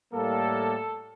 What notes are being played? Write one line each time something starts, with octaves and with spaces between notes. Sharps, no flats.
A2 G3 A#3 A4